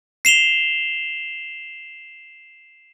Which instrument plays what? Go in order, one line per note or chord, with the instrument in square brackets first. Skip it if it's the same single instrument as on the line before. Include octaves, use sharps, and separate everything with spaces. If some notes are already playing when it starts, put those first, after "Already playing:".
[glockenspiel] C7 E7 F7 G7